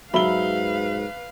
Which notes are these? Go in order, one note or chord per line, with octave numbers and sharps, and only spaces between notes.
G#2 F#3 B4 E5 F5 B5 G7